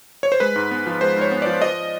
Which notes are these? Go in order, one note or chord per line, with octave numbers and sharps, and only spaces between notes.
C#5
C5
G#3 B4
G#2
B3
F3
G#3 C5
G#2
C#5
B3
D5
F3
F3 D#5